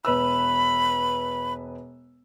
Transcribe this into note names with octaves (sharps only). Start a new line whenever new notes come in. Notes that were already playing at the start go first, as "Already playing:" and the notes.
E1 B4 B5 E6